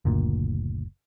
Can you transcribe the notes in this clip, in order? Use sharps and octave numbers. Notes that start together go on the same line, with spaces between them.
F#1 D2 A#2